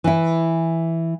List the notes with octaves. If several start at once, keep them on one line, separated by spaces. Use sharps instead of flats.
E3 E4